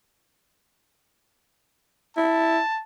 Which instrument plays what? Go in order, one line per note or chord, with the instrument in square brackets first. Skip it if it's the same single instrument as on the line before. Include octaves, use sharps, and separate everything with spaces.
[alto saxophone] E4 [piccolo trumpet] A5